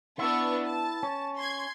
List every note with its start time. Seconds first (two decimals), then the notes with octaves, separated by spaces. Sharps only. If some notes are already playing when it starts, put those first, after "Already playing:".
0.19 B3 D4 E4 C#6
0.64 A5
1.03 C#4
1.37 C6 G#6